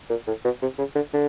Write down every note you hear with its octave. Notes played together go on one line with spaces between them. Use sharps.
A#2
A2
B2
C3
C#3
D3
D3